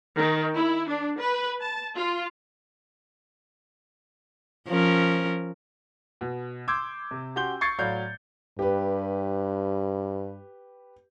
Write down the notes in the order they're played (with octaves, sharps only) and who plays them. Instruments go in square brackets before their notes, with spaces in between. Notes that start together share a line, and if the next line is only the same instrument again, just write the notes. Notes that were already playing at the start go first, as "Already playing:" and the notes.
[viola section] D#3
E4
D4
B4
A5
F4
[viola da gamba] F3 C#4 A#4
[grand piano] B2
C6 D6 E6 G6 G#6
C3
C#4 F#4 G4 C6 G6 G7
C#6 G#6 A6 C7 C#7
A2 F#3 C#5 D5 F5 G6
[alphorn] G2 [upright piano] G4 B4